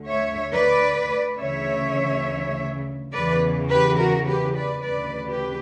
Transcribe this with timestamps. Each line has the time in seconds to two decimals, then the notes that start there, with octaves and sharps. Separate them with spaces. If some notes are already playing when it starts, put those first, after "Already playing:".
Already playing: D2 D3
0.10 C#5 E5
0.54 B4 D5
1.39 D2 C#3 E3 C#5 E5
3.12 E2 C#3 E3 B4 D5
3.70 G4 B4
3.98 F#4 A#4
4.27 G4 B4
4.56 B4 D5
4.85 D2 C#3 E3 B4 D5
5.28 G4 B4